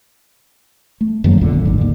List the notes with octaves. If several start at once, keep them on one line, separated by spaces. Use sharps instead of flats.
A3
F#2 D#3 F#3 A#3
B1 E2 A#2 D3
A#1
G#1 G#2
D#2 D3